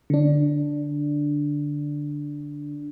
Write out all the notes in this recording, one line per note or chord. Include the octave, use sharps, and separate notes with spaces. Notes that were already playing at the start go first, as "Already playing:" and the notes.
D3 D4